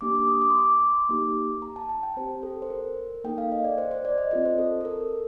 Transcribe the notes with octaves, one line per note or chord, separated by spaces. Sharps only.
A#3 D4 G4 D6
D6
D#6
D6
C6
D6
A#3 D#4 G4
A#5
A5
A5
G5
C4 G4 C5
A4
C5
A#4
A#3 D#4 A4 G5
F5
D#5
D5
C5
C5
D5
D#5
C4 F4 A4 D#5
C5
A4
A4
A#4